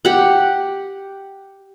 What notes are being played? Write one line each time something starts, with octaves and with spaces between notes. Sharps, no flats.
G4 F#5